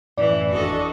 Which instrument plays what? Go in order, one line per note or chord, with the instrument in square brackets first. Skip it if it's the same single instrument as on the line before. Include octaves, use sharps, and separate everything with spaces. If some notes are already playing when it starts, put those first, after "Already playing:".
[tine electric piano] F#2 A2 [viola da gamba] E3 E4 [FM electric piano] D5
[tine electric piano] G#1 F2 E4 [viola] D4 D#5 [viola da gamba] F#4 A4